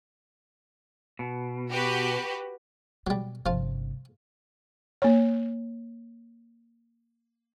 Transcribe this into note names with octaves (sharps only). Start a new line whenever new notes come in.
B2
F#4 G4 B4
B2 F#3 G3
G1 C3 F3 F4
A#3 C#5